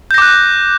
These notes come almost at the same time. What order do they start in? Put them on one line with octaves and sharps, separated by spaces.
G6 A#6 D6 F#6